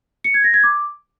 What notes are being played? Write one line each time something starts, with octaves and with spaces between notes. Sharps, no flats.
C#7
G#6
A#6
G#6
D6